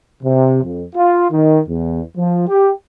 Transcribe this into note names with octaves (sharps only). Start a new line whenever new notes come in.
C3
F2
F4
D#3
E2
F3
G4